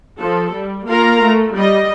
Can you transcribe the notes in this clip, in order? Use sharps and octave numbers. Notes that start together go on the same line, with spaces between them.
F3 A4
G3
A#3 F4 A#4 F5 A#5
A3
G3 D#5